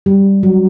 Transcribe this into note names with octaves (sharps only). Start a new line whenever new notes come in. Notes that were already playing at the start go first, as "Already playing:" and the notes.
G3
F#3